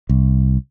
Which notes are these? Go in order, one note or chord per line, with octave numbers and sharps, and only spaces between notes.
C2